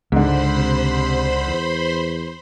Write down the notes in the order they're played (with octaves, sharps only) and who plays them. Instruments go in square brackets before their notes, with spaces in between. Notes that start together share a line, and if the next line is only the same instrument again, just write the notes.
[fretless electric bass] C#2 [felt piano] G#2 D3 [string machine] C5 B5 C6
[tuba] C3
E2